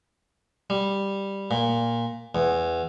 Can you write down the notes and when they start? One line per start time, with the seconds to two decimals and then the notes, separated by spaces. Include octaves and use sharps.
0.70 G3
1.51 A#2
2.35 E2